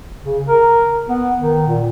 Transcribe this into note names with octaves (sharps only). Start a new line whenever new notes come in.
C#3
A#4
B3
D#3
A#2